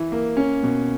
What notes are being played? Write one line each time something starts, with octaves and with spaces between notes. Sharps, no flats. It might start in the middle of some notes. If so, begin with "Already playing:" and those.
Already playing: E3 E4
A#3
C#4
B2